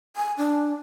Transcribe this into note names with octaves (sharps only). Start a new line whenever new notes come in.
G#5
D4